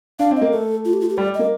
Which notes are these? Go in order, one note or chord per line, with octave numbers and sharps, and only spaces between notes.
D4 F5
C4
A#3 D#5
A3 A4
F4
G4
F4
G4
G3 D5
A#3 D#5